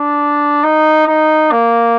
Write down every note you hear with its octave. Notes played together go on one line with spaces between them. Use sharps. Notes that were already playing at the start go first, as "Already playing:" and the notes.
Already playing: D4
D#4
D#4
A#3